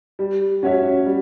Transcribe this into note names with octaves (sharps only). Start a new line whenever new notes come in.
G3
C#4 F#4 C#5 E5
G3